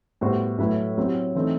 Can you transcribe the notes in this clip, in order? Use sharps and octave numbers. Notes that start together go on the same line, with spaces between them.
A2 G3 B3 F#4 C5
A2 F#3 A3 E4 B4
F#3 C4 E4 G4
E3 A3 C4 D#4